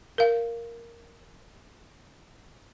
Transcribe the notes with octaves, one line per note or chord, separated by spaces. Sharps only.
A#4 F5